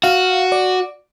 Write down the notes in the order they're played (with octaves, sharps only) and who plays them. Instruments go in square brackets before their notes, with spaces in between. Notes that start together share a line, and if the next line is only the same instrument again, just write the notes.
[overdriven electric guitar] F#4 [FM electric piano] F5
[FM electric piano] D5